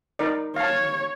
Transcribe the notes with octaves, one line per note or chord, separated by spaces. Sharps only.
D#4 A#4 D5
C#5 F5 A5